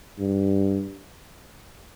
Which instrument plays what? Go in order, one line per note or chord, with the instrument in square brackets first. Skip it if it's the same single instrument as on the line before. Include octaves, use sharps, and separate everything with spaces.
[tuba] G2